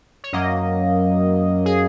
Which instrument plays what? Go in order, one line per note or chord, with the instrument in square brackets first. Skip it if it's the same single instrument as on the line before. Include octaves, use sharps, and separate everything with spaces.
[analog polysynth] C#5
F#2 F#3 A#3 D#5
G#4